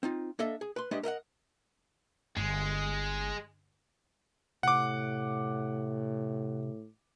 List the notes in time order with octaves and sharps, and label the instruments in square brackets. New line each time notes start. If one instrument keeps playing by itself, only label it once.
[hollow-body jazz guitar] C4 D#4 F4
A#3 D4 A4 D#5 E5
G#4
B4 C6
G#3 A3 D4 G4 B4 D#5
A#4 D#5 E5 F#5
[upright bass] G1 [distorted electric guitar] G#3
[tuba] A2 [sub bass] C3 [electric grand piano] F#5 D6